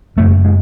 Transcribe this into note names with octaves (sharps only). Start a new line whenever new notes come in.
F#1 F#2 C#3 A3
G#3